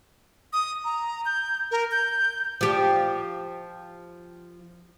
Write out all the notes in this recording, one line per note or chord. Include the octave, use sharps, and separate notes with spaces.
D#6
A#5
G6
A#4
G6
F3 G4